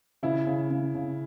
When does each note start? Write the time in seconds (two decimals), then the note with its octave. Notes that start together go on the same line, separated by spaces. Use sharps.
0.23 C#3 E4
0.46 C#3
0.70 C#3
0.94 C#3